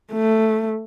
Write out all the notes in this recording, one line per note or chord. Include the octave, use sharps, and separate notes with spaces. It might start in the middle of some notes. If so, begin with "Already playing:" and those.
A3